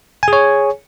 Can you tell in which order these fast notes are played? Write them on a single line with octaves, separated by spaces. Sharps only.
G#5 G#4 C#5